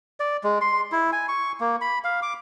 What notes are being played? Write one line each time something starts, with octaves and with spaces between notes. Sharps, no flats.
D5
G#3
C6
E4
G#5
C#6
A#3
B5
F5
D6